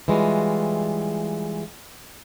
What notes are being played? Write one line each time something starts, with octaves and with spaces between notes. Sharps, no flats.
E3 G3 G#3 F4 F#4